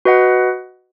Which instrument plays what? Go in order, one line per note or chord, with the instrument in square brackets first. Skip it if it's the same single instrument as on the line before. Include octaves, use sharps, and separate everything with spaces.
[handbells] F#4 B4 D#5 F#5